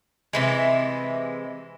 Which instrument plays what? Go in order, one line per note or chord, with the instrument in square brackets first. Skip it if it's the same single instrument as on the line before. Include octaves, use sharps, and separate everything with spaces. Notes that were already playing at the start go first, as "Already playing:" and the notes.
[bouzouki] C3 E3 G#3